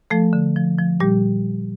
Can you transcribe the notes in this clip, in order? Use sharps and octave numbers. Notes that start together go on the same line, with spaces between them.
F3 A3 A4
D3
F3
F3
A#2 G3 G4